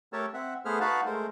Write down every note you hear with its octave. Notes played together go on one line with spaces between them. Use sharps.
A3 G4 A4 A#4 C#5 A5
C4 E5 F#5
A3 B3 G#4 B4 C5 F6
D#4 F#4 B4 F5 F#5 A5
G#3 A3 A#4 C5